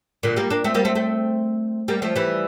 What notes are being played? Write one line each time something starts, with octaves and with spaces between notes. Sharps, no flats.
A#2 D3
G3 A#3
A#3 D4
A3 C4
G3 A#3
A3 C4
A3 C4
G3 A#3
F3 A3
E3 G3